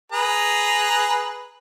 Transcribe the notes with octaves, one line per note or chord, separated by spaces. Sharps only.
G#4 B4 A#5